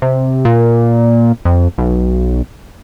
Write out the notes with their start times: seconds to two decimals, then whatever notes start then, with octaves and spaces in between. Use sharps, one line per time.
0.02 C3
0.45 A#2
1.45 F2
1.78 B1